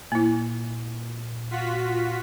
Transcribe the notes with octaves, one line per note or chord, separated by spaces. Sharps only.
A#2 A#3 E4
F4 F#4 B6